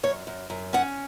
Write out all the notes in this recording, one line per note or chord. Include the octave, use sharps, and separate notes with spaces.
F#2 C#5
F#2
F#2
C#4 F#5